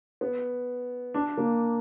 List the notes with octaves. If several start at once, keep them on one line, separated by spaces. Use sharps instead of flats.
B3
D4
A#3